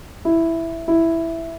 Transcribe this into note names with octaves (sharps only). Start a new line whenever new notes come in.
E4
E4